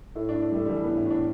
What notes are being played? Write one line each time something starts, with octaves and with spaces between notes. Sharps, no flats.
A2 A3
D4
A2
D4
G3 A3
G3
E3 A3
A2 B3
E4
A2 D4